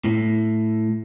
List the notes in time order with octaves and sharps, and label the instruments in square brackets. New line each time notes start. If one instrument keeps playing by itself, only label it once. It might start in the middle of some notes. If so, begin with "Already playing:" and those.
[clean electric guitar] A2